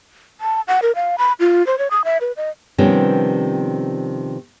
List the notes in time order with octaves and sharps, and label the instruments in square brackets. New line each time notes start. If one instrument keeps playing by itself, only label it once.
[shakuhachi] A5
F#5
A#4
F5
B5
F4
C5
C#5
D#6
E5
B4
D#5
[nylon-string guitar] C3 D#3 F3 G3 B3 C#4